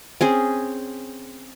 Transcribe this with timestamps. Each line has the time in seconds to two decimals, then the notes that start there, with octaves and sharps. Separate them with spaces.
0.21 C4 C#4 G#4